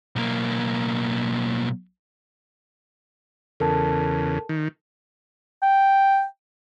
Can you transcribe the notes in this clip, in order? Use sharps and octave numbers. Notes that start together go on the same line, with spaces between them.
B1 A#3
E2 C#3 A4 A#4 A5
D#3
G5